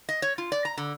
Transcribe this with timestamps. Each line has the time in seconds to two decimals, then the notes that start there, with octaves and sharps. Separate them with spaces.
0.09 D#5
0.22 C#5
0.38 F4
0.52 D5
0.65 A#5
0.77 D3